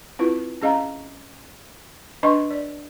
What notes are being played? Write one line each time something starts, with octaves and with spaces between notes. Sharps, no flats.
C4 E4 F4 B4
C#4 G#4 D#5 F5 A#5
D4 B4 D#5 C6 C#6
D5